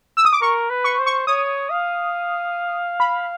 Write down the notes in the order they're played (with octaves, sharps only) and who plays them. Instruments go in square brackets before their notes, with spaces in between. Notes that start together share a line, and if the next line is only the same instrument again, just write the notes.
[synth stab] E6
D#6
D6
[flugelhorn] A#4 [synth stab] C#6
[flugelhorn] B4
[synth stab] C#6
[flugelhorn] C5
[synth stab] C#6
[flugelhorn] C#5 [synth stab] D#6
[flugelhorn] F5
[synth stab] B5